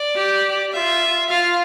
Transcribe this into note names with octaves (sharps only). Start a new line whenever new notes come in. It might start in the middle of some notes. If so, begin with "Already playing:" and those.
Already playing: D5
G4
F4 E5
F4 F5